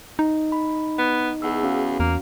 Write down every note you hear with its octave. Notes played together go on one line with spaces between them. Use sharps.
D#4
B5
B3
E2 G#4 F#5 E6
C#4 F#4 F5
E2 A#3